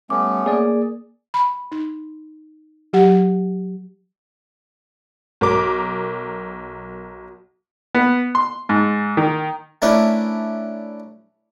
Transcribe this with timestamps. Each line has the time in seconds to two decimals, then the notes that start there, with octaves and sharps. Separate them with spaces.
0.10 G3 A3 B3 C#4 D6
0.46 A#3 G#4 D5
1.34 B5
1.72 D#4
2.93 F#3 G4 F#5
5.41 B1 A#4 D6
7.95 B3
8.35 C6
8.69 G#2
9.17 D#3
9.82 A3 C#4 D4 E4 A#4 B4